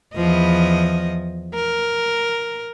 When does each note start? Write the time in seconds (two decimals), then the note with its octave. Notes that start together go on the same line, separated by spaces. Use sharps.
0.15 E2 F3 D#5
1.55 A#4